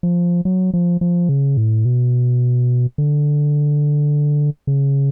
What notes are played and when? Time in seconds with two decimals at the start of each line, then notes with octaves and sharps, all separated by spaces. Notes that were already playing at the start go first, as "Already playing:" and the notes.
0.03 F3
0.45 F#3
0.74 F3
1.01 F3
1.29 C#3
1.57 A2
1.85 B2
2.98 D3
4.67 C#3